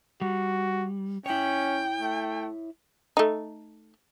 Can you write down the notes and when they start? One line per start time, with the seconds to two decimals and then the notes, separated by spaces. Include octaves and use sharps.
0.21 G3 F#4
1.26 C#4 E4 C#5 G5
2.00 A3
3.17 A3 D#4